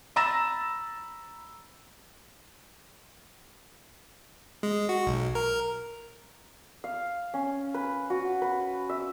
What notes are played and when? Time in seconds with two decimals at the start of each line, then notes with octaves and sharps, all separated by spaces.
0.16 A#5 B5 E6 A6 A#6 E7
4.63 G#3
4.89 F#4
5.07 B1
5.35 A#4
6.84 F5
7.34 C#4
7.74 B4
8.10 F#4
8.42 B4
8.89 E5